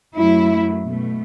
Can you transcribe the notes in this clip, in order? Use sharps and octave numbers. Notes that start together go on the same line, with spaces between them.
F#2 F#3 A3 E4
B2 A3